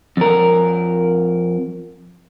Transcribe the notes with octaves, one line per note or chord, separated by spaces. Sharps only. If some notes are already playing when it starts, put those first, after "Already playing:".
F2 A#4